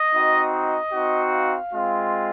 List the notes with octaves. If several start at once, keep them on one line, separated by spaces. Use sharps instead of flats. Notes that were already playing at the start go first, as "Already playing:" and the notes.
Already playing: D#5
C4 D#4 F#4
D#5
C4 D#4 F#4
F5
G#3 C4 F4